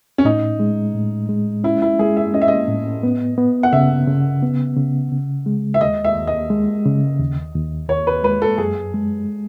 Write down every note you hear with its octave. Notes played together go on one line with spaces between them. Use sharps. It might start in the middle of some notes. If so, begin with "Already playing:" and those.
C#4
A2 D#4
G#3
A2
G#3
C#4 E4
E4
G#3 G#4
E5
C#4 D#5
E5
D#5
A2
B3
B3
F#5
C#3 E5
C#3
B3
C#3
C#3
G#3
E5
D#2 D#5
E5
D#2
D#5
G#3
C#3
D#2
D#2
D#2 C#5
B4
G#3 B4
A4
F#2 G#4
G#3